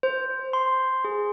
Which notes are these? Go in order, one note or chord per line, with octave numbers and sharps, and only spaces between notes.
C5
C6
G#4